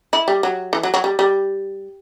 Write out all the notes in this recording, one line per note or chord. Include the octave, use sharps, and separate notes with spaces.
E4
G3
F#3
E3
F#3
F#3
G3
G3